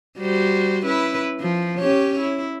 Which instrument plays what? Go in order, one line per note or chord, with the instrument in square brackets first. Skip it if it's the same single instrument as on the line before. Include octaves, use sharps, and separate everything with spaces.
[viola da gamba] G3 F#4 C5
C#4 E4 B4
F3
C#4 G4 C#5
E4